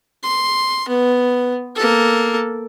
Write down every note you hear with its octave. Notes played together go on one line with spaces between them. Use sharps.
C6
B3
A#3 A4